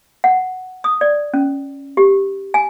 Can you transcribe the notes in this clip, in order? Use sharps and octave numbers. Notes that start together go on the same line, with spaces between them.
F#5
D#6
D5
C#4
G4
G#5